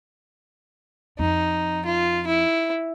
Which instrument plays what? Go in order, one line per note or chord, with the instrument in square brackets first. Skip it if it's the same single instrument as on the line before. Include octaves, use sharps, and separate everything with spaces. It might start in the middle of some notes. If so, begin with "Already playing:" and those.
[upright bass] F2 [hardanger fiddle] D#4
[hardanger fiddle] F4
E4